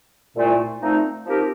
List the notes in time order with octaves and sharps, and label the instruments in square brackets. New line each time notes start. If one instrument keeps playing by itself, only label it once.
[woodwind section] C2 A#2 A3
A#2 F3 A3 C4 D#4
F3 C4 D#4 G4 A#4